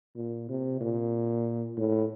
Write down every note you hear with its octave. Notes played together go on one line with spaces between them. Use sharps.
A#2
C3
A#2
A2